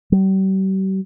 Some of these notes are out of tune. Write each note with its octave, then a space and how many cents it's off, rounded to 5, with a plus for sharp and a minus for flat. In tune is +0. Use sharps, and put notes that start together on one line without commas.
G3 -40